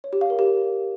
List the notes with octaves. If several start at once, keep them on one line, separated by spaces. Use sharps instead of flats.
C#5
G4
F5
A#4
G4